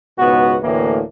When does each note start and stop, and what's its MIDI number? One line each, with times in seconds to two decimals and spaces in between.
0.18 0.57 37
0.18 0.57 44
0.18 0.57 47
0.18 0.57 59
0.18 0.57 66
0.62 1.01 38
0.62 1.01 45
0.62 1.01 52
0.62 1.01 58